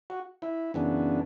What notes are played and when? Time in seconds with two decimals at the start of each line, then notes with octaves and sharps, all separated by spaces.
0.10 F#4
0.42 E4
0.74 F#2 C#3 E3 B3 D4